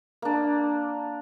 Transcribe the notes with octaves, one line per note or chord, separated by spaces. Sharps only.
A#3 D4